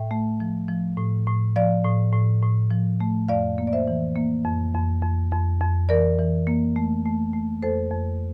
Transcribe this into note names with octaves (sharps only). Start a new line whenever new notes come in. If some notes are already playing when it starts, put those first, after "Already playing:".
Already playing: A2 E5 G5
A3
F3
F3
A2
A2
F3 D5 F5
A2
A2
A2
F3
A3
F2 D5 F5
A#3
D5
C5 E5
E3
A#3
F2
F2
F2
F2
F2
E3 A#4 D5
E3
A#3
A3
A3
A3
F2 A4 C5
F2